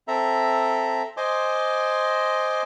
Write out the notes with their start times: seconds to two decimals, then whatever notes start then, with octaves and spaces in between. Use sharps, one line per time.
0.08 C4 A4 E5 A#5
1.17 C5 D#5 G#5 C6 D6